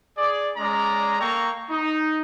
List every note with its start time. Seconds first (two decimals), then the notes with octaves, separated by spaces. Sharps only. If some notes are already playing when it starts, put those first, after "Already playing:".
0.17 G#4 D5
0.57 G#3 C#4 D5 A#5
1.19 A#3 A4 G5 A#5 C#6
1.70 D#4